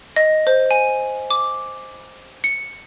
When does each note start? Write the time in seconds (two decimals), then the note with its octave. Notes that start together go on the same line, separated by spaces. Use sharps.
0.16 D#5
0.47 C5
0.71 G#5
1.31 D6
2.44 C#7